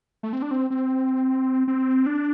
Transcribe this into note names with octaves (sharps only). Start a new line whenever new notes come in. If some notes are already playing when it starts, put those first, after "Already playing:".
A3
C4
D4
C4
C4
C4
D4